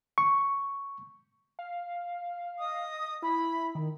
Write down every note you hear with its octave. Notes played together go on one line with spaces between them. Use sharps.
C#6
F5
D#5 D#6
E4 B5
D#3